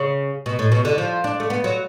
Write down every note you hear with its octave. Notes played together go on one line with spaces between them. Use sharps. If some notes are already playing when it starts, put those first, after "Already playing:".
Already playing: C#3
B2
A2
B2
D3
F3
D4
A3
B3
F#3